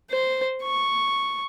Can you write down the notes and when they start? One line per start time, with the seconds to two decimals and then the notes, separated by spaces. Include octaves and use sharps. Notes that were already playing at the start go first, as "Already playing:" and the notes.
0.10 C5
0.63 C#6